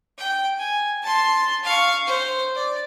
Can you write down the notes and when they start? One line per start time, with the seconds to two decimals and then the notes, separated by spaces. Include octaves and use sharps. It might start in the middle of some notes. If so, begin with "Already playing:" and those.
0.18 G5
0.58 G#5
1.02 A5 C6
1.64 F5 C#6
2.07 C5
2.55 D5